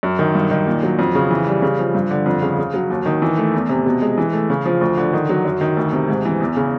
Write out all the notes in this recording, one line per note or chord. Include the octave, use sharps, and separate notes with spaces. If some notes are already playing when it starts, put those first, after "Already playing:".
F#2
D#3
G2
D#3
A#2
F#3
F2
C#3
E3
G3
C#3
F3
G2
D3
F2
C#3
C#3
F#3
D#2
D#3
E3
A3
E2
C3
B2
G#3
E3
A3
C#3
F3
D2
D3
D#3
F#3
F#2
D#3
D2
C3
G#2
E3
E2
C#3